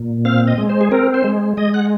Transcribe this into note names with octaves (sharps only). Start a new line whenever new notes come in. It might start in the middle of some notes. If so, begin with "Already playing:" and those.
Already playing: A#2
C4 F5
D#5
G#3
C5
G#4
C4 A#4
C5
G#3
G#3 D#5
F#5